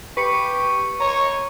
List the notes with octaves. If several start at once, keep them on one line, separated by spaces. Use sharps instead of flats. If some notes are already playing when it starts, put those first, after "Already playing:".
G4 B4 C#6 C#7
C#5 A#5